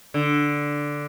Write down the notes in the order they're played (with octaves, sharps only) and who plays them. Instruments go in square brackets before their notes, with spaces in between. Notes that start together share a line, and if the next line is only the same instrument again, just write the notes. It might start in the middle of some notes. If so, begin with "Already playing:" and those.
[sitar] D3